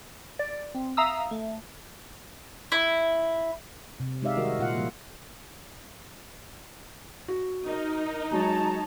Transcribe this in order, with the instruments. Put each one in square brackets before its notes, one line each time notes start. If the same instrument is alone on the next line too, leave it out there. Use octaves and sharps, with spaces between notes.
[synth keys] D5
C4
E5 F5 A#5 D#6 E6
A3
[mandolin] E4
[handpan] C3
G#3 D#4 G4 D5 E5 F5
D#3 G3 F#4 A#4 D#5
A#2 F4 F5 F#5
F3 G3 A#3
[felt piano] F#4
[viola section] D#4 [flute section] A#4
[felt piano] F#3 G#3 [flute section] C#5 A5 A#5